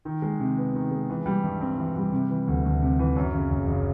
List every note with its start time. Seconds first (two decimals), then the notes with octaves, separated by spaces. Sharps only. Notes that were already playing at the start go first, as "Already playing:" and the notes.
0.05 D#3
0.22 G#3
0.40 C3
0.58 B3
0.75 D#3
0.91 G#3
1.10 E3
1.26 G3
1.44 G2
1.61 C4
1.78 E3
1.96 G3
2.12 C3
2.30 E3
2.47 D2
2.65 D2
2.82 C3
2.99 E3
3.16 F#2
3.33 C#3
3.50 F#1
3.68 F#1